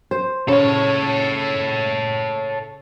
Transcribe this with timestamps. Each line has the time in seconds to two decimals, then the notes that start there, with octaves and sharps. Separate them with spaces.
0.11 C5
0.48 C#3 A4 C#5